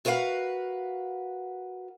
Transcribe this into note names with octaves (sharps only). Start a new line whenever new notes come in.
F#4 A#4 B4 D5 F5 F#5